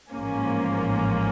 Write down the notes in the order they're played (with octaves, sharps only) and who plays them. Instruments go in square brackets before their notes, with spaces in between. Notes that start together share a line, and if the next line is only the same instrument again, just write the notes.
[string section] A1 G#2 F3 A#3 C#4